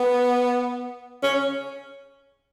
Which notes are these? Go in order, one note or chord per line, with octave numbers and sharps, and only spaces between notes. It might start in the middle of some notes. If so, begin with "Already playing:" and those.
Already playing: B3
C#4